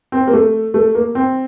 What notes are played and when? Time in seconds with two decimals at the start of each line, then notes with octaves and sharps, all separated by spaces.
0.12 C4
0.27 A#3
0.33 A3
0.74 A3
0.95 A#3
1.15 C4